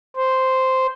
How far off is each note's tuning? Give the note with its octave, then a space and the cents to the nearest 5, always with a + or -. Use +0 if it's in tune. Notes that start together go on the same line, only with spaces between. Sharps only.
C5 -5